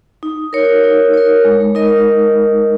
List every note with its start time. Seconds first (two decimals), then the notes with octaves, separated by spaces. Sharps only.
0.23 D#4
0.53 A#4 C#5
0.84 D#4
1.14 A#4 C#5
1.45 G#3
1.75 D#4 A#4 D#5